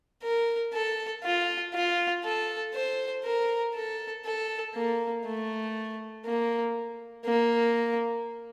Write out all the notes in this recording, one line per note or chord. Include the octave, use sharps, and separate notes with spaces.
A#4
A4
F4
F4
A4
C5
A#4
A4
A4
A#3
A3
A#3
A#3